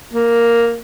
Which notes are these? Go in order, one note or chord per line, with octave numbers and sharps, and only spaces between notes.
A#3